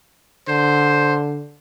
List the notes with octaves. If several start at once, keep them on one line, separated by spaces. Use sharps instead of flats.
D3 C5